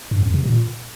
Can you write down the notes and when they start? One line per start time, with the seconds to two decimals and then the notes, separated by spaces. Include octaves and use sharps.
0.11 G2
0.23 F2
0.34 C3
0.46 A#2